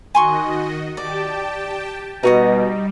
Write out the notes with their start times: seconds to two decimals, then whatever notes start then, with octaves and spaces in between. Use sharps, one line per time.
0.15 D#3 F#4 D#5 G#5 C6 C#6
0.97 G4 D5 G5 A5
2.23 B2 G3 D#4 F#4 D#5